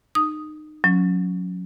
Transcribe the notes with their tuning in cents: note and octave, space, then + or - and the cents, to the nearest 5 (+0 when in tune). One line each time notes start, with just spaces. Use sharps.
D#4 -30 D#6 +0
F#3 -30 C#4 +0